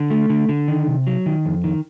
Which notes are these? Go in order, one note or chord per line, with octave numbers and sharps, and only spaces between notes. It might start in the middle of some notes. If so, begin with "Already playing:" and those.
Already playing: D3
A3
D3
D3
D#3
C3
F#3
D#3
F2
D#3